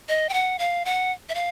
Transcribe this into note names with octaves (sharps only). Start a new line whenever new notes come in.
D#5
G5
F#5
F5
F#5
E5
F5